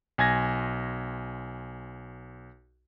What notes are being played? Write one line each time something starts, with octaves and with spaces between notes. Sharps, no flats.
B1 G#5 G#6 A#6